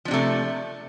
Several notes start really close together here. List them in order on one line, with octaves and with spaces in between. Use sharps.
F3 D4 C3 A3